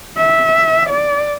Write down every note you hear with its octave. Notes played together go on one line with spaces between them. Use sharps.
E5
D5